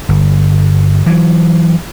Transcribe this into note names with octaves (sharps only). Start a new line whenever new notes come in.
G1
E3 F#3